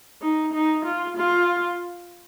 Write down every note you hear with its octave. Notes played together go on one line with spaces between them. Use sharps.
D#4
D#4
F4
F4